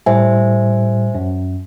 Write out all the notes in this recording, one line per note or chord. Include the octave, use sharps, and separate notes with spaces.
A2 G3 C5 E5 G#5
F#2